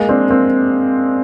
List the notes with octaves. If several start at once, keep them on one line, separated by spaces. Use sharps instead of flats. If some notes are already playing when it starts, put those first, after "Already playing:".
Already playing: G#3 A#3
C4 D4
A#3 C4